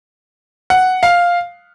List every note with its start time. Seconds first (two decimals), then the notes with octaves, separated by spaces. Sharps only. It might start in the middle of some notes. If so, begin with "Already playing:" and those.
0.70 F#5
1.03 F5